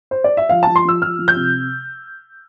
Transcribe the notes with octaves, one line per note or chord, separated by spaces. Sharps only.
C5
D5
E5
F3 F5
F3 A5
C6
F3 E6
F3 F6
F3
G6
C3